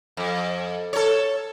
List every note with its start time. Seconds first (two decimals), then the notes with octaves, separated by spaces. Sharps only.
0.17 F2
0.93 A4 C#5